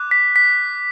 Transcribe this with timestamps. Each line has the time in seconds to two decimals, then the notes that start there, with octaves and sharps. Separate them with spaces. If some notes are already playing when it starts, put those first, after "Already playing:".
Already playing: D6 F#6
0.11 B6
0.36 B6